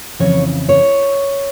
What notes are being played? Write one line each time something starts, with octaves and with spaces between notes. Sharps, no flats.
F2 C#3 E3 C#5
C#5